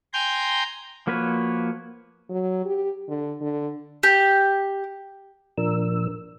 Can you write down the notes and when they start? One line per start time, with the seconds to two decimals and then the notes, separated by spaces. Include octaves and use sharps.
0.13 G5 G#5 A#5 C6 G6
1.07 F3 A#3 F#4 B4 C#5
2.30 F#3
2.65 G4
3.08 D3
3.41 D3
4.03 G4
5.58 A#2 F3 D4 A#4 E6